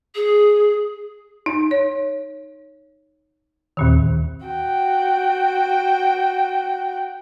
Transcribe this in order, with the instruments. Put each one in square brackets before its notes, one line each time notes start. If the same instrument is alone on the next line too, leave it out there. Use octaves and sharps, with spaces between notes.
[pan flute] G#4
[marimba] D#4
C#5
D#2 A#2 D#3
[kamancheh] F#4 G5